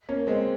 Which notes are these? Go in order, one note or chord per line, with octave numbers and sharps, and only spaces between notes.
A#3 C#4
G#3 C4